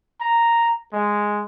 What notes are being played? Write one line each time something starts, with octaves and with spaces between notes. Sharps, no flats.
A#5
G#3